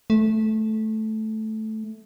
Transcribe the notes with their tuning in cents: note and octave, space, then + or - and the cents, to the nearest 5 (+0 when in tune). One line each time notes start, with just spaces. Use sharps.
A3 -10